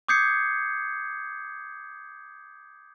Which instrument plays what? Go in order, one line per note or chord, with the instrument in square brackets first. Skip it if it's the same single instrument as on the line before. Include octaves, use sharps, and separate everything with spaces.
[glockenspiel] D6 D#6 G6 G#6 C7 C#7